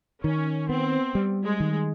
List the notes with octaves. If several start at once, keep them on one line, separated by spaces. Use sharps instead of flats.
D#3 C#4
B3 C4
G3
G#3
D#3